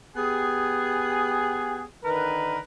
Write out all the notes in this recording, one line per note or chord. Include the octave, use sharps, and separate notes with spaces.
B3 G4 G#4
D3 D#3 A#4 B4